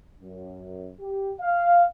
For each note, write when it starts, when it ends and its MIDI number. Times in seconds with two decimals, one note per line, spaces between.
0.21 0.93 42
1.01 1.33 67
1.41 1.85 77